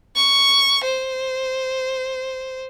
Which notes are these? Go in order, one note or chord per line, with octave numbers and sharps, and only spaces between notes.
C#6
C5